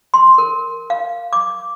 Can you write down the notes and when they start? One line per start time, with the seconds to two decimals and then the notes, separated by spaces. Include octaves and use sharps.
0.14 C6
0.38 A#4
0.90 F5
1.33 D6